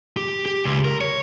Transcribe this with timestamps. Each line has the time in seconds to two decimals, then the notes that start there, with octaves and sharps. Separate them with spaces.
0.17 G4
0.46 G4
0.65 C#2
0.85 A#4
1.01 C#5